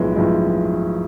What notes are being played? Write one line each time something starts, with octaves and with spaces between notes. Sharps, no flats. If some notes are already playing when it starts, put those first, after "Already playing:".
Already playing: B1 A2 F3 G#3 B3
B1 A2 F3 G#3 B3